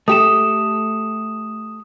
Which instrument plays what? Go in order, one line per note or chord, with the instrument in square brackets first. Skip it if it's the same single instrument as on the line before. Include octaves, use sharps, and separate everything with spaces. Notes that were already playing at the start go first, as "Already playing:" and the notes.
[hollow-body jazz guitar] A3 G4 A4 [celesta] D#6 E7